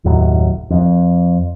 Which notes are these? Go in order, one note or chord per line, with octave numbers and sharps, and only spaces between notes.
F#1 D#2 A2 F#3
F2